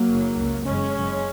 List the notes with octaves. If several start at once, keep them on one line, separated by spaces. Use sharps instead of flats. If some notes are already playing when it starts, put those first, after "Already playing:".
Already playing: F#3 A#3
F#1 F#2 C#3
C#2 C#3
F#1 F#2 C#3 G#3 C#4
F#1 F#2 C#3